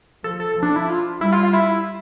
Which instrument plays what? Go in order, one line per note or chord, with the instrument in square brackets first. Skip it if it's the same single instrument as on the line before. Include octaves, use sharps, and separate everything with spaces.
[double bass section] F3 [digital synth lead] A4
[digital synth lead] A4
[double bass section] F3
[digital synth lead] D4
E4
F4
[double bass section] G3 [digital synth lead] E4
[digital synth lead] F4
F4
E4